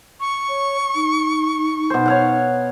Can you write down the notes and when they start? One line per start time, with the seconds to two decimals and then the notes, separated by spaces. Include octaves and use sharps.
0.20 C#6
0.49 C#5
0.95 D#4
1.90 B2 C5
2.06 C#5 F5 F#5